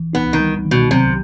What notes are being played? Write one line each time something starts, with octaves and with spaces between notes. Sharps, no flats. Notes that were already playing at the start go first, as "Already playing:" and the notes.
Already playing: E3
B3 D#4
D#3
G3
D#3
B2
C3 F#3